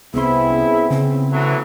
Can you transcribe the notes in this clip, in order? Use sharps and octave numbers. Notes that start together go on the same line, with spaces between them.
C2 B3 C4 E4 G#4 C6
C#4
C#3 C4
E3 F#3 A3